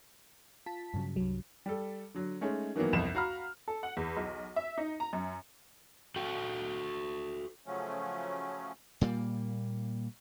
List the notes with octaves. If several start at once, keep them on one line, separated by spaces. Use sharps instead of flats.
F4 A5 B6
G2 C#3 F#3
C2 G2 F#3
G3 A4
D3 F#3
G#3 A3 C#4 D#4
D#3 E3 F#3 A#3 B3
G1 C2 F2 E7
F#4 F5 A#5 B5 F6
A4
F#5
E2
B1
E5
D#4
A#5
F#2
F#4 A4 G5
C#3 F3 F#3 A3 C#4
A#2 G3 A#3